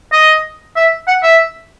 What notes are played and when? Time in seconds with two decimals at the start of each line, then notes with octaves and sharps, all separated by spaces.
0.12 D#5
0.76 E5
1.07 F#5
1.23 E5